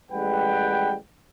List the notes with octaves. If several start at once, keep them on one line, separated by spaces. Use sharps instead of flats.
A1 G3 G#3 B4 F#5 G5